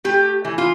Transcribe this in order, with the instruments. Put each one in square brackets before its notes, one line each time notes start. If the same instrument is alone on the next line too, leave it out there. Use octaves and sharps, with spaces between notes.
[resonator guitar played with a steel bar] A3 G4
E3
F4